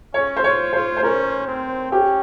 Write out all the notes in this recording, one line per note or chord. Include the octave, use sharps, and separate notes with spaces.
C#4 C#5
C5
F4 C#5
F4 C5
C5
C#4 A#4
C4
C#4 G4